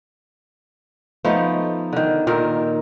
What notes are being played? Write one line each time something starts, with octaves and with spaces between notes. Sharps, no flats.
F3 A3 B3 D#4
D3 D#3
A#2 D#3 A#4